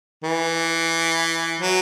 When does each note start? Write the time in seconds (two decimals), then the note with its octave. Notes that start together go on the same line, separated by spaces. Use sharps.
0.23 E3
1.60 F#3